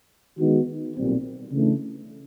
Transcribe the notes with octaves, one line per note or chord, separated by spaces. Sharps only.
D#3 G#3 B3 D#4 F#4
B1 A#2 G3 C4
C#3 E3 A3 D4